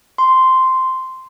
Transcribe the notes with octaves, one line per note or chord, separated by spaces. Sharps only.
C6